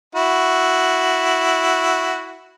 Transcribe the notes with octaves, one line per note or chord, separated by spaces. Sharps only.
E4 F#4